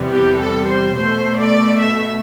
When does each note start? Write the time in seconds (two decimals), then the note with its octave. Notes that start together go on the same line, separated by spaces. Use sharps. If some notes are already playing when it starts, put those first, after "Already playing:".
Already playing: E2 C3 E3 G3 B3
0.11 G4
0.40 A4
0.68 C5
0.95 B2 A3 C5
1.38 D5
1.80 E5